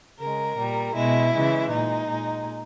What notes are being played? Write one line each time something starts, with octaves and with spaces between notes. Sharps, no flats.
C#3 G#3 A#4
A#2 G3
B2 G#3 E4
C#3 E3 G#3
A#2 G#3 D#4
A#2 G#3